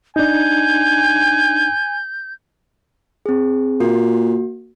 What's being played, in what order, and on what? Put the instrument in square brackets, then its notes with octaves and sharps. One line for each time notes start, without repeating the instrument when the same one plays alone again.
[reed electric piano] D4 D#4 [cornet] G#5 [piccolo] G6
[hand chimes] C4 G#4
[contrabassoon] A#2 [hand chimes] A#3 F#4